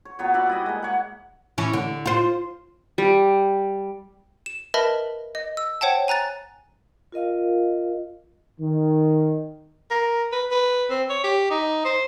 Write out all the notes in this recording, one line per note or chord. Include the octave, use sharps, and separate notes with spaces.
C#5
A#2 F#3 B3 C#5
F#4 D5 E5 B5
G3 E4 D#5
G#3 A#3
C#5 F#5
E3 C#4
D3
F4 C5
G3
E7
A#4 B4 D#5 E5 A5 B5
D#5
E6
C5 C#5 F#5 G5 A5
G#5 A#5 F#6 A6
F4 A#4 D#5 F5
D#3
A#4
B4
B4
C4
C#5
G4
D#4
C5